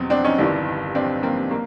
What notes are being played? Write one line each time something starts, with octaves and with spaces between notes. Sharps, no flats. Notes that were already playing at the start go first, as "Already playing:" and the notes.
Already playing: E2 B2 F#3 B3 C4
C4 D4
C#4 D#4
G1 G2 D#3 D4 E4
C4 D4
A#3 C4
A#3